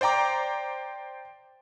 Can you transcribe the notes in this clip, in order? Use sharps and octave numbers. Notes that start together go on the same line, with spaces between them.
C5 D5 G5 A#5 D6